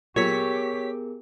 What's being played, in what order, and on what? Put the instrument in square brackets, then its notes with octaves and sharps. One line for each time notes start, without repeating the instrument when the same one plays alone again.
[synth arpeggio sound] A#2 F#3 [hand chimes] B3 G#4 A#4 [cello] G4 [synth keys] C#5 B6